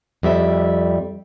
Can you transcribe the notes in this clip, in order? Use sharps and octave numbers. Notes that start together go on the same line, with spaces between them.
F2 G3 E5